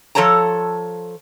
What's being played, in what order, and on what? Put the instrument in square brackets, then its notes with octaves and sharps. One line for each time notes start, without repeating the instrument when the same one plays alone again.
[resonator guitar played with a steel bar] F3 A4 C#5 A5 A#5